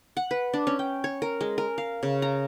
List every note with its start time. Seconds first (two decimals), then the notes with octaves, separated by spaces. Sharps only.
0.17 F#5
0.31 B4
0.53 D4
0.67 C#4
0.79 G5
1.04 C#5
1.22 A#4
1.41 G#3
1.58 A#4
1.78 F5
2.03 C#3
2.22 A#5